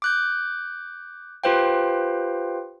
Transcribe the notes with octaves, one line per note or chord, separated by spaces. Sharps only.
D6 F#6 G6
F4 G4 B4 C5 F5 G5